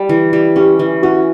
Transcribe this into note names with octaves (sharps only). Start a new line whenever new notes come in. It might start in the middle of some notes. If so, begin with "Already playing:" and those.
Already playing: G3
E3
G3
C#4 G4
E3
C#4 F#4